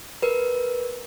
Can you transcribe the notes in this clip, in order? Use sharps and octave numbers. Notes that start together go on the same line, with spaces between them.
A#4 B4